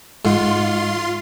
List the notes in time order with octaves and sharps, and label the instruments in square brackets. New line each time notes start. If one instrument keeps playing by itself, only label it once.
[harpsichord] G#2 [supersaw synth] F4 C6